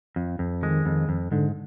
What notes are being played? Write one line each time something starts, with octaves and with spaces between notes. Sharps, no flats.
F2
F2
D#3 G#3
F2
F2
G#2 D3